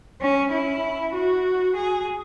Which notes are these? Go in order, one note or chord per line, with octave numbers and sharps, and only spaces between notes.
C#4
E4
F#4
G#4